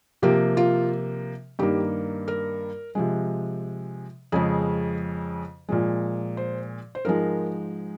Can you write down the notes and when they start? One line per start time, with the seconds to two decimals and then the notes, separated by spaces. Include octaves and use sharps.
0.22 C3 F3 A#3 G4
0.57 F4
1.59 G2 D#3 A#3 G4
2.28 A#4
2.95 C3 F3 G#3
4.32 F2 C#3 G#3 G#4
5.69 A#2 F3 G#3
6.37 C5
6.95 C5
7.05 G#2 F3 G#3 A#4